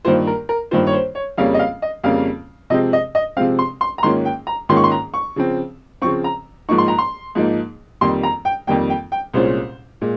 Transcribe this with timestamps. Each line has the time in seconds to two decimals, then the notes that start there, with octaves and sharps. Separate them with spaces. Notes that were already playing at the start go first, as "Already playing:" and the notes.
0.05 G2 D#3 A#3 F4 C5
0.27 A#4
0.49 A#4
0.71 G2 D#3 A#3 F4 C5
0.87 C#5
0.93 C5
1.15 C#5
1.38 F2 C#3 G3 A#3 C#4 F5
1.54 D#5
1.59 F5
1.82 D#5
2.04 F2 C#3 G3 A#3 C#4 F5
2.70 C3 F3 G#3 C4 D#5
2.93 D#5
3.15 D#5
3.37 C3 F3 G#3 C4 F5
3.59 C6
3.81 C6
3.98 A#5
4.03 G#2 D#3 A#3 C#4 F4 C6
4.25 G5
4.47 A#5
4.69 G#2 D#3 A#3 C#4 F4 C6
4.77 C#6
4.84 C6
4.92 A#5
5.14 C#6
5.36 C#3 F3 C4
6.02 C#3 F3 C4 C#6
6.24 A#5
6.69 G#2 F3 A#3 D#4 C#6
6.78 C6
6.88 A#5
6.98 C6
7.35 G#2 F3 A#3 D#4
8.01 F2 D#3 G3 A#3 C6
8.23 A#5
8.45 G5
8.67 F2 D#3 G3 A#3 G5
8.90 G5
9.12 G5
9.34 C2 A#2 G#3 C#4 F4 C5
10.02 A#2 G#3